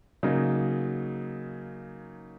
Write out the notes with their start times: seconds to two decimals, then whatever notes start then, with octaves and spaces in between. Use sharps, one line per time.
0.23 C#3 F#3 A#3 D#4